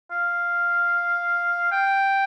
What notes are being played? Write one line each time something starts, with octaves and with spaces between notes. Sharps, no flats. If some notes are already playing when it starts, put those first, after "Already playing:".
F5
G5